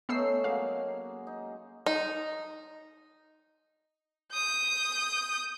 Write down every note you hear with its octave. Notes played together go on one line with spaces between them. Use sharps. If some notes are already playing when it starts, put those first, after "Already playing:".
A3 B3 C#4 D#4 E6 C7
F#3 G#3 A#3 F5
D#4
D#4
D#6 G6